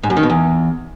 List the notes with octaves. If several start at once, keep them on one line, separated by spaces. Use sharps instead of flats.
G#2
F#2
D#3
B2
E2